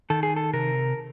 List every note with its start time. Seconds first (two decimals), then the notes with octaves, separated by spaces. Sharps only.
0.10 D#3 A4
0.23 G#4
0.36 A4
0.53 C3 A#4